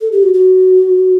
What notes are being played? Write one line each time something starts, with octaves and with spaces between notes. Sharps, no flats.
A4
G4
F#4
F#4